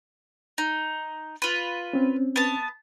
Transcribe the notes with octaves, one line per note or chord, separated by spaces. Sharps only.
D#4
F4 B4
C4 C#4
B3 A5